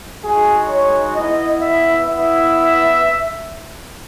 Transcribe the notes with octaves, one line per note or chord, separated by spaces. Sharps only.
G#3 D#4 F#4 G#4
C#5
B3 E4 D#5
E5
B3 E4 E5